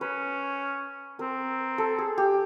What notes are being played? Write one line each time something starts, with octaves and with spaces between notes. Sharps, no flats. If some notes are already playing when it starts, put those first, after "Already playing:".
C#4 B4
C4 A#4
A4
G#4
G4